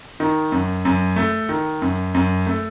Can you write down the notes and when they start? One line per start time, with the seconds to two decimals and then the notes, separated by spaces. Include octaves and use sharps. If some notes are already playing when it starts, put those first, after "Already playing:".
0.20 D#3
0.52 F#2
0.85 F#2
1.16 A3
1.49 D#3
1.82 F#2
2.15 F#2
2.47 A3